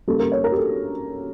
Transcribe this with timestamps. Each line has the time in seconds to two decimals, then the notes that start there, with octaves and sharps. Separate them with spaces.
0.07 C#3 G3 A#3 A4
0.20 A#4
0.32 C#5
0.44 A#4
0.52 G4
0.57 A4